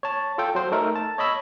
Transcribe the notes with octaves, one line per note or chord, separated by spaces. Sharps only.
C#5 A5
F4 A4 G5
F#3 C5
A3 D#4 A4 A#4
A5
C#5 D#5 B5 E6